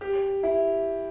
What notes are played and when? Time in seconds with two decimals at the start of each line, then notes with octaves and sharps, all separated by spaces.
0.01 G4
0.43 E4